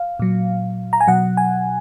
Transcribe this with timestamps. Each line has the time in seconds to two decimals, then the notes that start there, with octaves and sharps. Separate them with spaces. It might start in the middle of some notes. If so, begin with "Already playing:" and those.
Already playing: F5
0.20 A#2 F#3
0.93 A#5
1.00 G#5
1.07 B2 F#3 F#5
1.37 G#5